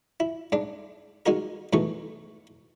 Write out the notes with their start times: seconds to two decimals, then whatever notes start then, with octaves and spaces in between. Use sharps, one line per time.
0.20 E4
0.52 G#2 D4
1.26 G#3 D#4 F#4 A#4
1.73 G#2 B2 E3 A3 C#6